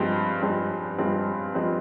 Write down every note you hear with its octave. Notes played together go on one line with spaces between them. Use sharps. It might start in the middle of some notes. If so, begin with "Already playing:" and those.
Already playing: G2 F3 G#3 C4
G2 F3 G#3 C4
G2 F3 G#3 C4
F3 G#3 C4